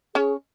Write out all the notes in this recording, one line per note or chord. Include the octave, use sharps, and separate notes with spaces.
C#4 G#4 C#5